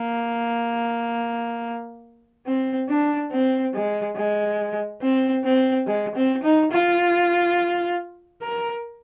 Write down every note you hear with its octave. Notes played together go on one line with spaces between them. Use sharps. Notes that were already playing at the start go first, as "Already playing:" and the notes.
Already playing: A#3
C4
D4
C4
G#3
G#3
C4
C4
G#3
C4
D#4
F4
A#4